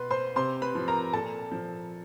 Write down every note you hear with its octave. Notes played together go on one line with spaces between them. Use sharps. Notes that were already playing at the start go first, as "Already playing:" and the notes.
Already playing: B2 B4 C6
C5 C6
C3 C5 C6
B4 B5
F3
A#4 A#5
A#2 A4 A5
F3